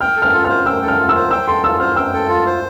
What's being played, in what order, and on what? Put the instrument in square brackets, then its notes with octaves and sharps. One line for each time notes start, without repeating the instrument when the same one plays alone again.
[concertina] G5 [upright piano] F6
[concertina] A4
[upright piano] F6
[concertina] F4
[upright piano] F6
[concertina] C5
[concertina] G5 [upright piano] E6
[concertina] A4
[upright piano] F6
[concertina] F4
[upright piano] E6
[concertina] C5
[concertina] G5 [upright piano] E6
[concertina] A4 [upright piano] C6
[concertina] F4 [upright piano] E6
[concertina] C5 [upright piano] F6
[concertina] G5 [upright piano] E6
[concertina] A4
F4
C5